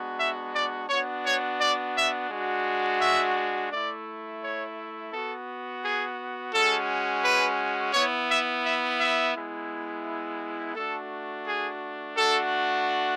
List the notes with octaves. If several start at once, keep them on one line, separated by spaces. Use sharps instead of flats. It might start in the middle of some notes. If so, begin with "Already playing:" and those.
Already playing: G#3 B3 D4 F#4
E5
D5
B3 D4 F#4 C#5
C#5
D5
E5
G#3 D4 F#4
E5
A3 E4 D5
C#5
B3 F#4 A4
G#4
G#3 C#4 F#4 A4
B4
B3 E4 C#5
E5
E5
E5
G#3 B3 E4
A3 D4 F#4 A4
G#4
A3 D4 F#4 A4